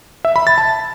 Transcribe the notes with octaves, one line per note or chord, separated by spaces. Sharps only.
E5
B5
A6
A5